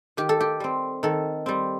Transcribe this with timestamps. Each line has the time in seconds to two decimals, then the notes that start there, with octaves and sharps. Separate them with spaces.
0.17 D#3 G4
0.29 A4
0.40 G4
0.60 G3 C4
1.03 D#3 A4
1.46 G3 C4